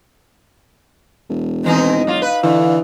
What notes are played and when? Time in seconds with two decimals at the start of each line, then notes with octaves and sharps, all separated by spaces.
1.29 E1
1.64 D#3 E3 C4 D#4
2.07 F#3 F4
2.22 B4 F5
2.43 D3 E3